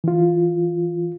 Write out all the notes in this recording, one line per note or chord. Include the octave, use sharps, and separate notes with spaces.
E3 F4